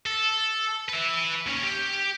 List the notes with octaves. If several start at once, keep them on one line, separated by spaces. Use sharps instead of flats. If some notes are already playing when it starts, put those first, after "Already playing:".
A4
B4 E5
D#2 C#4
G4